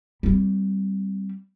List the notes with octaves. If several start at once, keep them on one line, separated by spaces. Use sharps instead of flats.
G3 C4